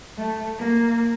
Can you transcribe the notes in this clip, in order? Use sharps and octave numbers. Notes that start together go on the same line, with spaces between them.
A3
A#3